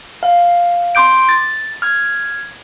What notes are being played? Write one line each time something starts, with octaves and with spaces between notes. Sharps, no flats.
F5
C6 D6 G6 D7
A6
F6 G#6